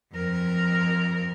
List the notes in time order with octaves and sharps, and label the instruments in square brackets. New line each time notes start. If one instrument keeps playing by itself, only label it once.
[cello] F2 A#4